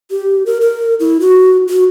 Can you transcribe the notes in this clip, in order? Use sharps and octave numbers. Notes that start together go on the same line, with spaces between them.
G4
A#4
A#4
E4
F#4
F#4